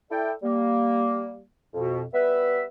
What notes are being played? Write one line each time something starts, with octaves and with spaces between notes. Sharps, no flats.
E4 A4 D5 G5
G3 A#3
F2 B2
G3 B3 B4 E5